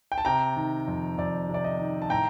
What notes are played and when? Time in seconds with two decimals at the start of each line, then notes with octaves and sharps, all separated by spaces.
0.12 G5
0.18 A5
0.25 C3 G5 A#5
0.56 D#3
0.88 F2
1.18 F2 D5
1.49 C3
1.54 D5
1.64 D#5
1.79 D#3
2.02 A5
2.10 A2 G5 A#5